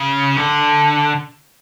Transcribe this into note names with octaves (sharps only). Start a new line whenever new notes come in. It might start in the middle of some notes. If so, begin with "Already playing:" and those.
Already playing: C#3
D3